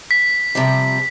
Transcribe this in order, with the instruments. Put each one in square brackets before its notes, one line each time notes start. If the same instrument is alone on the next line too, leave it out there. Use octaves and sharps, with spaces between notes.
[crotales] B6
[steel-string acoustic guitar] C3 F3 G3